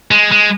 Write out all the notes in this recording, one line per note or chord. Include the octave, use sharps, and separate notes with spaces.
G#3
G#3